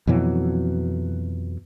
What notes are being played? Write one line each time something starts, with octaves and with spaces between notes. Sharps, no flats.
F2 B2 E3 F#3